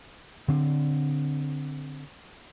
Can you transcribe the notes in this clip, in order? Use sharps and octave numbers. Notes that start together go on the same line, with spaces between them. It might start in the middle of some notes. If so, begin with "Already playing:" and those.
D3 C4